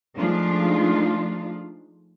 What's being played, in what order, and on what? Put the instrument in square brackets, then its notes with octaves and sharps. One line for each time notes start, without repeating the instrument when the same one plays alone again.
[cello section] F3 G#3 A3 D4 D#4 F4